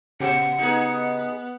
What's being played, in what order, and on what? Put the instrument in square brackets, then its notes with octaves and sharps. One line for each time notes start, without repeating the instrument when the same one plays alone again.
[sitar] A#2 B3 C5 [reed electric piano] C#3 G4 [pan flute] F#5
[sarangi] B3 [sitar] D#4 G#4